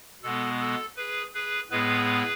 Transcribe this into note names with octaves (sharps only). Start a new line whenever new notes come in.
B2 G#3 B3 A4
A4
G#4 B4
G#4 B4
A2 G#3 B3 G#4 B4